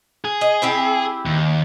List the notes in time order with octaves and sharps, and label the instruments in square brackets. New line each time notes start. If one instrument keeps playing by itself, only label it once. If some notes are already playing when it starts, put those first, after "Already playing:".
[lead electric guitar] G#4
[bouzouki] D#5
C4 E4 G4
[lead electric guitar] D#2